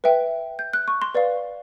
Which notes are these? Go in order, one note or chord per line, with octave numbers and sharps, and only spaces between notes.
B4 E5 G5
G6
F#6
C#6
C6
B4 D5 F5